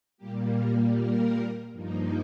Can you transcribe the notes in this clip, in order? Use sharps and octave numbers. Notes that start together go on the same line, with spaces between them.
A#2 G3 A#3 G4
A#4
A#4
G2 F3 A#3 D#4